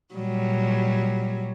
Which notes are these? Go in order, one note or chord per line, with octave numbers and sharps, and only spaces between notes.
A#2 F#3 G3